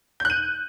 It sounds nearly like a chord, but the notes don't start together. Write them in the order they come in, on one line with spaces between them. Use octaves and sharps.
G6 F#6 D#7